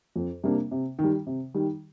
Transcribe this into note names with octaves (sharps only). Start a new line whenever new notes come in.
F2
C3 G3 A#3 D4
C3
D#3
G3
C3
D#3 G3